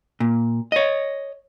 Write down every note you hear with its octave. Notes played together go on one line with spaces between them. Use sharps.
A#2
C#5 D#5